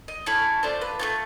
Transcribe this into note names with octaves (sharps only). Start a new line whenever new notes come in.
D#5
C#4 E4 A4 C#5
A3 D4 F4 C5
B4
A3 D4 F4 C#5